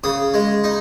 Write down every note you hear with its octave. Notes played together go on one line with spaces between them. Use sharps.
C#3 D#6
G#3
D#4